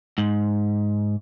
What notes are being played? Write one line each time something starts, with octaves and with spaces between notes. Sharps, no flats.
G#2